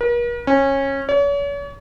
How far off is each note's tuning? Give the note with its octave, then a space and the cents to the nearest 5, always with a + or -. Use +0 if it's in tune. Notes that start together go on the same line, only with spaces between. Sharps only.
A#4 +45
C#4 -20
C#5 +40